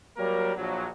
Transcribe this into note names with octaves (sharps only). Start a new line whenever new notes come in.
F#3 G3 A#3 A#4
A#1 F#3